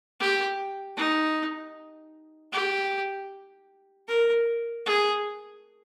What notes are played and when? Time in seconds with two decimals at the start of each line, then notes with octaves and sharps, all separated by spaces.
0.20 G4
0.97 D#4
2.52 G4
4.08 A#4
4.86 G#4